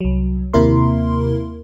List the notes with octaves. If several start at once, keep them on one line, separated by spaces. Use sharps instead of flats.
C2 F#3
D#2 C3 A#3 E4 A#4 C6